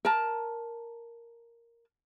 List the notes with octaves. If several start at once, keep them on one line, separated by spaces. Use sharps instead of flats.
A#4 A5